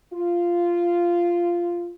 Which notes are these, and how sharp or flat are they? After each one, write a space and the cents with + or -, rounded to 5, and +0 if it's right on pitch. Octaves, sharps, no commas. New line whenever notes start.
F4 -10